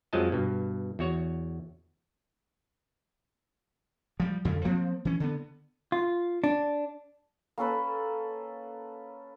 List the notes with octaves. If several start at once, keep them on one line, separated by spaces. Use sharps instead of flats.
F2 F3 F#3 G#3 D#5 A5
G2 B2
E2 F#4 C#5
F3 G3
F2 D3 F3
F3 A#3 C4
E3 C#4
D3 B3
F4
D4
A#3 C#4 A4 B4